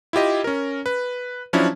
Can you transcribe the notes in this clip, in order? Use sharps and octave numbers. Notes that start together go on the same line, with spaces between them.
E4 F4 G4 D#5
C#4 A#4
B4
F3 F#3 C#4 D4 E4